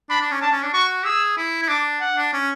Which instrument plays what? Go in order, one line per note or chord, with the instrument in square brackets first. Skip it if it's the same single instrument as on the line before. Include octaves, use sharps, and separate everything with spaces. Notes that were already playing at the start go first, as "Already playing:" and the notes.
[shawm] D4 [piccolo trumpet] B5
[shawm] D4
C#4
[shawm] D4 [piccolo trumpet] A5
[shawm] C#4
D4
[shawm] F#4 [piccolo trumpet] C#6
[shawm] G#4 [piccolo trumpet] E6
[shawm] E4
E4
[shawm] D4 [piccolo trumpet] D6
[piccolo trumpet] F#5
[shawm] D4
C#4